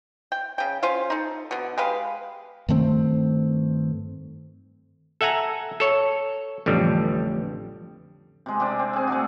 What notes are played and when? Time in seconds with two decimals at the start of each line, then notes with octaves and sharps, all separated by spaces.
0.32 G5
0.58 C#3 G5
0.83 C#4 F4 C5 F5
1.10 D#4 A4
1.51 B2 D3
1.78 G#3 G4 B4 F5
2.69 G2 D#3 A3 C4
5.21 A4 E5 F#5 G#5 A#5
5.80 A4 C#5
6.66 A1 F2 D3 G3
8.46 C3 G#3
8.60 C3 C4 D4
8.79 C4
8.93 C4 G#4
9.08 A3 D4 F#4